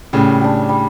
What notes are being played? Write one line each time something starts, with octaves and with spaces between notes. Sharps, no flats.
A2 C#3 G3
D4 G4
G3